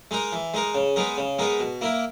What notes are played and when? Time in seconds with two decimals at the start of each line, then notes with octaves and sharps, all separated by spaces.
0.11 G#3 D#4 A#4
0.33 E3
0.54 G#3 D#4 A#4
0.75 C#3
0.96 G#3 B3 D#4 A#4
1.17 C#3
1.39 G#3 B3 D#4 A#4
1.60 B2
1.81 A#3 E4 A#4